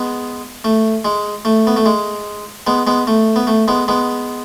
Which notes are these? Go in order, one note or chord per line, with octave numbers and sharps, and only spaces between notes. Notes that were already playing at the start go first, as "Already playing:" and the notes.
Already playing: G#3 B3
A3
G#3
A3
B3
A3
G#3
G#3 B3
G#3 B3
A3
B3
A3
G#3 B3
G#3 B3